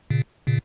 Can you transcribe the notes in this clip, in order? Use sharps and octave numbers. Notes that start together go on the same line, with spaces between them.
A#2 C#3
A#2 C#3